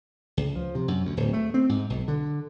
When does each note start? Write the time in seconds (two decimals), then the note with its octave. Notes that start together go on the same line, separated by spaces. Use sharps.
0.37 C#2
0.56 F3
0.75 C3
0.88 F#2
1.05 D2
1.17 D1
1.33 A3
1.54 C4
1.69 G#2
1.90 B1
2.08 D3